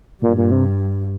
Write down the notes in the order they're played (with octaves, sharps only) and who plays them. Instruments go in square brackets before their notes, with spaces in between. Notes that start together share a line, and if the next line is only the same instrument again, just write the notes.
[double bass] G2 [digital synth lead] A#2
[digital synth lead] A#2
C3